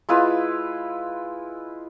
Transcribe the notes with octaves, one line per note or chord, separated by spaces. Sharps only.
G#3 E4 F4 B4